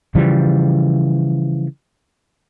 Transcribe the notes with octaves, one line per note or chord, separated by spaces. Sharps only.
C#3 E3 F3 G3